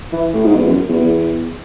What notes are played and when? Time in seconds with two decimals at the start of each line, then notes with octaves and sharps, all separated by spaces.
0.12 E3
0.34 A2
0.45 G#2
0.55 E2
0.67 F#2
0.89 E2
1.00 E2